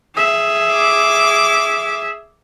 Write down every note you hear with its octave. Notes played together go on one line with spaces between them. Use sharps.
G#4 E5
D6